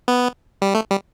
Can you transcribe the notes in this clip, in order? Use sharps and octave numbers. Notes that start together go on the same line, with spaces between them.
B3
G3
A3
G3